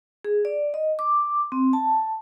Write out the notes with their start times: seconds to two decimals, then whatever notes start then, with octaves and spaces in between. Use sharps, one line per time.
0.25 G#4
0.45 D5
0.74 D#5
0.99 D6
1.52 C4
1.73 A5